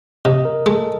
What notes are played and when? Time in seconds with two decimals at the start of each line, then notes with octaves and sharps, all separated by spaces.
0.25 C3 D#5
0.45 A#4
0.66 G#3 A4